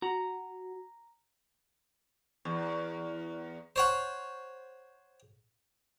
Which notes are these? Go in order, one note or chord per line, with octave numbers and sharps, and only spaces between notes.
F#4 A#5
E2
C5 C#5 F#5